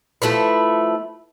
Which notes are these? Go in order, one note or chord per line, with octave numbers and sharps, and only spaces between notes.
F3 A3 E4 B4